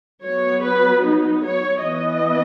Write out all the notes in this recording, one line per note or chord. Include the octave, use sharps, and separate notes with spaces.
F#3 B3 C#5
B4
D#4
C#5
E3 B3 D#5